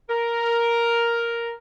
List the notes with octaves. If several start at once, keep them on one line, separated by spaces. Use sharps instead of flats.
A#4